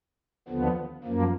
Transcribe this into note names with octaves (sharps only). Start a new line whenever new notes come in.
D#2 D3 F3 B3
F#2 F3 A#3